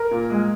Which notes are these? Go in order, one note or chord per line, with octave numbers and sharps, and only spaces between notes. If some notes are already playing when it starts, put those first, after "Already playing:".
Already playing: A#4
A#2
G#3